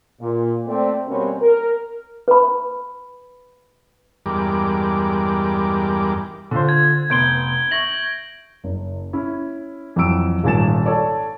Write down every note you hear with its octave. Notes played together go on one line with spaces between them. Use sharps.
A#2
A3 C4 D5
G2 B2 G3 A#3 C4 C#4
A#4
B4 B5
E2 G2 G3 G#3 A#4 D6
D3 F4 C5
G#6
F1 B3 C6 G6 D7 G7
E5 C#6 A#6 F#7
F#1
C#4 E4
F2 E3 F#3 E6 D7
D#1 G#1 G#5 A6 E7
A4 C#5 D5